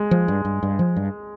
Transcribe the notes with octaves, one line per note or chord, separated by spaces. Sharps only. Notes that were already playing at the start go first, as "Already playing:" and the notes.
Already playing: G#3
F3
G2
G2
G2
F3
G2